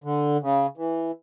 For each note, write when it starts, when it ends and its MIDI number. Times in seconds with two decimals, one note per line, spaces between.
0.04 0.37 50
0.43 0.67 49
0.77 1.11 52